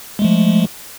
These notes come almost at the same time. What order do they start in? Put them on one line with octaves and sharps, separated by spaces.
G#3 A3 F3